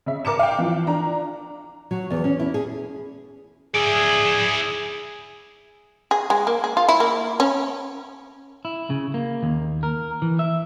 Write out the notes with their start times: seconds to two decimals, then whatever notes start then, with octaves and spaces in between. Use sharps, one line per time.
0.06 C#3 E5
0.25 A#4 D6 C#7 E7
0.39 F5 G5
0.59 E3 F3
0.87 D4 A#5
1.91 F#3
2.10 E2
2.24 C#4
2.39 E4
2.54 G#4
3.75 E4 G#4 D5
6.11 G#4
6.30 G#3
6.47 A#3
6.64 G#4
6.77 F4
6.89 E4
7.00 A#3
7.40 C#4
8.65 E4
8.90 C#3
9.14 A#3
9.43 D#2
9.83 A#4
10.22 E3
10.39 E5